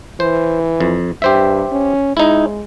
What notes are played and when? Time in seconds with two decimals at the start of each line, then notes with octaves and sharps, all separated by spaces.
0.20 E3 C5
0.80 F2
1.22 G2 G4 C5 E5
1.72 C#4
2.17 G#3 D#4 E4